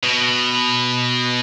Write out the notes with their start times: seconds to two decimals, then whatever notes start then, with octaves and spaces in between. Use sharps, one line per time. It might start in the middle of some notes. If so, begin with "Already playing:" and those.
0.03 B2